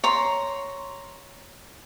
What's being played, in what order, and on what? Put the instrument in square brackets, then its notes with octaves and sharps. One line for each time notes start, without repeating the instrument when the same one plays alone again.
[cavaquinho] C#5 A#5 C6